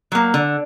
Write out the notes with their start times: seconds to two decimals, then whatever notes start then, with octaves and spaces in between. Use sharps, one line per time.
0.12 F#3 A#3
0.34 D3